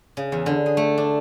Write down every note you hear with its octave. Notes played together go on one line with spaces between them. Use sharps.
C#3
E2
D3
G#4
A3
D4